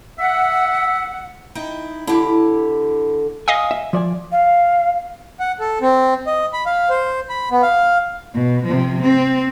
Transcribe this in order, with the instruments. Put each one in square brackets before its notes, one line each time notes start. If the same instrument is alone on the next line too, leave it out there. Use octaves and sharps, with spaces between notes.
[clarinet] E5 [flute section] F#5
[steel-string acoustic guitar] D#4 E4 G5
[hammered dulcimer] D3 [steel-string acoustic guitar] E4 G4
[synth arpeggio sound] D#5 F5 D#6 [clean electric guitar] G#5
[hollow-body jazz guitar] E5
F3 D5 G#5
[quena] F5
[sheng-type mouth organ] F#5
A4
C4
D#5
B5
F5
C5
B5
B3
F5
[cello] B2
C3 F3
C4